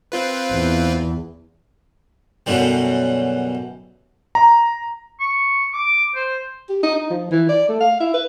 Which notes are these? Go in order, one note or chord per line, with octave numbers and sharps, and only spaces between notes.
C4 F4 B4
E2
F#2 B2 D3 E3 G3
A#5
C#6
D6
C5
G4
D#4
D#4
F3
E3
D5
A3
F5
E4
B4